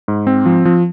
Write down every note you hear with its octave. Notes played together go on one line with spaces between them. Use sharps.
G#2
C4
F3
F3